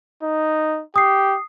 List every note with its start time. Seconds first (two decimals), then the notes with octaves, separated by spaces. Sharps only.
0.23 D#4
0.96 G4 D#6 C7